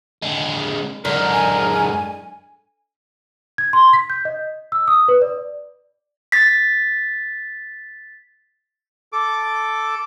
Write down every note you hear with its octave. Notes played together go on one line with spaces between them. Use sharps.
D3 G#3
F#2 D3 G#3 A#4
G#5
G#6
C6
B6
G6
D#5
E6
D#6
B4
D5
A6 B6
A4 D6